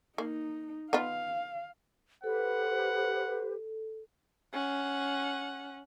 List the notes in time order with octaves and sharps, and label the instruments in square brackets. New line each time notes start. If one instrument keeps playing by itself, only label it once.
[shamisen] A#3 [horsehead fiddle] D#4
[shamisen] B3 D#4 F4 [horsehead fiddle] F5
[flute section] G4 B4 C5 [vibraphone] A4 [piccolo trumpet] F#5
[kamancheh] C#4 F#5